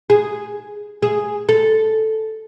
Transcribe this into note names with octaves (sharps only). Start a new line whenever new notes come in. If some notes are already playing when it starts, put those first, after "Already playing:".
G#4
G#4
A4